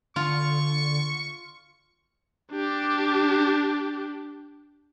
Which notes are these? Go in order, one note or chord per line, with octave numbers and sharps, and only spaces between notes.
D3 F4 C#6
D4 G4